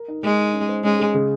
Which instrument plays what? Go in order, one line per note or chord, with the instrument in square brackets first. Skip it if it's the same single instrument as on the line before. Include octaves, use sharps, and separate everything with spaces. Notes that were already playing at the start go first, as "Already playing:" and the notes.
Already playing: [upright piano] A#4
D#4
[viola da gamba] G#3 [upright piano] D#4
[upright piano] D#4
C#4
C5
[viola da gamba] G#3 [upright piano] C#4
[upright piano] G#4
C#3